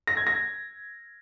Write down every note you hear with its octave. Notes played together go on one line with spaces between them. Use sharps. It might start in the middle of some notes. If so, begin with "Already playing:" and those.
A#6
G#6
A#6